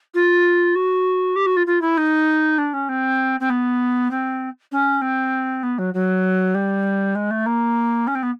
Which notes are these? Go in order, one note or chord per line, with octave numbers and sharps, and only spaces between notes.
F4
F#4
G4
F#4
F4
F4
E4
D#4
D4
C#4
C4
C4
B3
C4
C#4
C4
B3
F#3
F#3
G3
G#3
A3
A#3
C#4
C4
B3